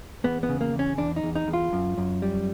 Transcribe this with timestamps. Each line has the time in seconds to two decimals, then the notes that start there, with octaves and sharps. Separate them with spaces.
0.24 E2 B3
0.43 B3
0.49 C#3
0.61 A#3
0.73 E2
0.79 C#4
0.98 E2 D4
1.16 D#4
1.23 E2
1.35 D#4
1.48 E2
1.53 F4
1.73 F#2
1.98 F#2
2.22 G3